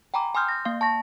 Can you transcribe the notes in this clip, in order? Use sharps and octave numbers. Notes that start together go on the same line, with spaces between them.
G5 G#5 A#5 B5 D6
G#5 C6 D#6 F6 G6
G6 A#6
A#3 F5
A5 C#6 A#6